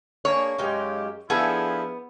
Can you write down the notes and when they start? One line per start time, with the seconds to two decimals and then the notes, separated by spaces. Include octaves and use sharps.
0.25 A#3 D4 G#4 C#5
0.58 F#2 F#3 G#3 D#4 G4 F5
1.30 F3 B3 D4 E4 G#4 A4 F5